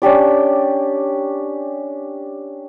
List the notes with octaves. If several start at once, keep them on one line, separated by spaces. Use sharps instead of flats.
C#4 D4 G4 D5